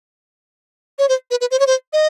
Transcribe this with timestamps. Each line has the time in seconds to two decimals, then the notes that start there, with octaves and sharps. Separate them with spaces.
0.99 C#5
1.09 C5
1.31 B4
1.41 B4
1.51 C5
1.59 C#5
1.67 C5
1.93 D#5